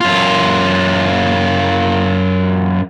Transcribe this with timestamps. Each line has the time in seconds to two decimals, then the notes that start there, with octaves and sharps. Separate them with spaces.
0.01 F#2 F4